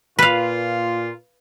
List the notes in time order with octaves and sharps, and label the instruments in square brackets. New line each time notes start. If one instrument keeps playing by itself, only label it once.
[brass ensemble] A#2 F4 [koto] B4 F5